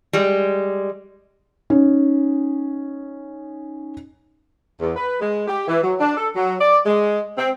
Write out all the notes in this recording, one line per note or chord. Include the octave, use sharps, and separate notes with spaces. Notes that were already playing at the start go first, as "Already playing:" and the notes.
G3 G#3
C#4 D#4
E2
B4
G#3
G4
E3
F#3
D4
A4
F#3
D5
G#3
C4